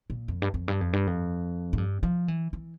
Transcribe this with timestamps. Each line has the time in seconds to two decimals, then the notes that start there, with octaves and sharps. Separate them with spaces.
0.10 A#2
0.28 F2
0.42 G2
0.54 F2
0.68 G2
0.81 F2
0.93 G2
1.07 F2
1.73 G#2
1.78 G2
2.03 F3
2.28 E3
2.53 E3